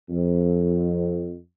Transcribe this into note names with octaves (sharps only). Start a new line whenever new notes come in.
F2